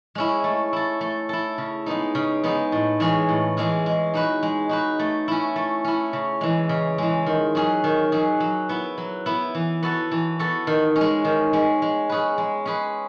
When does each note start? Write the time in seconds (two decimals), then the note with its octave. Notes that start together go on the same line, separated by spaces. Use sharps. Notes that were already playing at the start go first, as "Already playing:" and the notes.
0.15 G#3 C#4 E4
0.44 A3
0.73 E4 A4
1.01 A3
1.29 E4 A4
1.58 C#3
1.86 G#3 B3 D#4
2.15 C#3
2.43 G#3 B3 D#4
2.72 A2
3.00 E3 G#3 C#4 G#4
3.29 A2
3.57 E3 G#3 C#4 G#4
3.86 G#3
4.13 D#4 F#4 B4
4.43 G#3
4.69 D#4 F#4 B4
4.99 A3
5.28 C#4 E4
5.56 A3
5.85 C#4 E4
6.13 C#3
6.41 E3 G#3
6.69 C#3
6.98 E3 G#3
7.26 D#3
7.55 F#3 C#4 G#4
7.84 D#3
8.12 F#3 C#4 G#4
8.40 F#3
8.69 B3 E4
8.98 F#3
9.26 B3 E4
9.55 E3
9.83 B3 F#4 A4
10.11 E3
10.39 B3 F#4 A4
10.67 D#3
10.96 C#4
11.01 G#3
11.25 D#3
11.53 G#3 C#4
11.82 G#3
12.09 C#4 G#4 B4
12.38 G#3
12.65 C#4 G#4 B4